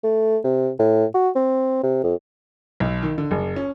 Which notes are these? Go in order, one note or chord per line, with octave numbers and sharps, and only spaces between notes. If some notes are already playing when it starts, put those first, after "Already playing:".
A3
C3
A2
F#4
C4
C3
F2
B1
D#3
D3
F#1
C#4